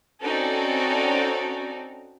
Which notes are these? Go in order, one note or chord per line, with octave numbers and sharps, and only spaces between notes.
C4 C#4 D#4 F#4 A4 D5